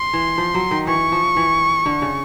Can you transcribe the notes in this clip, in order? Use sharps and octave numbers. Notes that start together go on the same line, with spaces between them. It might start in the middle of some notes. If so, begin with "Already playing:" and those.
Already playing: C6
E3
F3
F#3
D#3
E3 C#6
F3
E3
D3
C#3